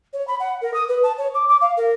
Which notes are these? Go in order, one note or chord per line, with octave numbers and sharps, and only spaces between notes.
C#5
B5
F#5
A#4
D#6
B4
A5
C#5
D6
D6
F5
A#4